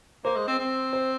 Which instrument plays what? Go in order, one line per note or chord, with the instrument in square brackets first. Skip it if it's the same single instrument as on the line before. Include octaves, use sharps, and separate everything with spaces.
[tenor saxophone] A#3 [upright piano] C5
[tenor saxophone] G#3
C4
C4
[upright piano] C5